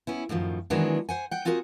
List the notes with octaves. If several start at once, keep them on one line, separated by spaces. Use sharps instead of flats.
B3 C#4 E4
F#2 A2 D#3 F3
D#3 E3 F#3 G#3 B3 D4
C5 F#5 G#5
F#5 G5
C4 F4 F#4 G#4 A#4 F#5